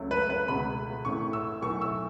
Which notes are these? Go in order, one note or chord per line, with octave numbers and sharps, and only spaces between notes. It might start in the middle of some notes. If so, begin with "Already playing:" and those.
Already playing: C#2 C#3 F#3 A3
B4
B4
C#2 B2 A3 B5
A1 A2 A3 C#6
E6
B1 A2 A3 C#6
E6